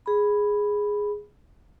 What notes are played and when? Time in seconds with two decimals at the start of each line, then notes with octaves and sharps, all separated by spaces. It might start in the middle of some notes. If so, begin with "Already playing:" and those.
0.06 G#4 B5